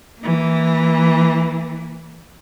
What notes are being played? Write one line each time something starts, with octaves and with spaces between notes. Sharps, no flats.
E3 A#3